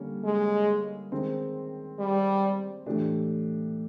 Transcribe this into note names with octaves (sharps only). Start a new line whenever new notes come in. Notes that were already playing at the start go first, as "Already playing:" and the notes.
Already playing: D3 G3 A#3 C#4
G#3
D#3 G#3 C4
G3
A2 E3 A3 D4 G4